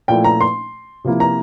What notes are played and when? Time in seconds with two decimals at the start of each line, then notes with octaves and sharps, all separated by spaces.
0.08 A#2 F3 A3 E4 G5
0.24 A#5
0.41 C6
1.04 C3 F3 A#3 E4
1.20 A#5